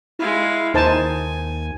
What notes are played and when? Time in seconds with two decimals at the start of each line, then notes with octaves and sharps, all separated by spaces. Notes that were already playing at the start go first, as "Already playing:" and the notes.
0.19 G#3 E4 F5
0.74 D#2 D#4 C5 G#5 A5